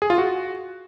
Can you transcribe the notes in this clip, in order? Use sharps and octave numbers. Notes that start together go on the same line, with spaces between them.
G#4
F4
F#4